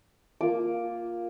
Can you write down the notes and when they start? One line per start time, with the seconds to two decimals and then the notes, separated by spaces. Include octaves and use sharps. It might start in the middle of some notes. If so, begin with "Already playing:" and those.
0.41 A#3 F4 D6